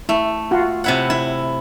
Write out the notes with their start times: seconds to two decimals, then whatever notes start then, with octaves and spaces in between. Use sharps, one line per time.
0.09 A3 E4
0.51 F4 F#4
0.84 C3 E4 F#5
1.10 E4